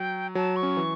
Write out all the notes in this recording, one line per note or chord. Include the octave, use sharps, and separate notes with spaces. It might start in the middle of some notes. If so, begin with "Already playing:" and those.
Already playing: F#3 G5
F#3 A5
C#6
C#4
E3